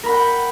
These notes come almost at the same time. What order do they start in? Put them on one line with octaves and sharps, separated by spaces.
A#4 B5 F#5 G5